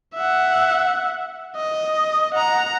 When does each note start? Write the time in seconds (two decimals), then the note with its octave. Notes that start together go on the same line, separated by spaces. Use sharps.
0.14 E5 F#5
1.56 D#5
2.34 F#5 A#5